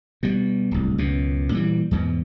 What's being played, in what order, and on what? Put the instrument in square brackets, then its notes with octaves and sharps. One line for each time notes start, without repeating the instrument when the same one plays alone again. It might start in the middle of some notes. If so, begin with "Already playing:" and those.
[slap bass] B2 G3
D1 C2
C#2 F#2 B2
A#2 E3 G3
E2 G#2 B2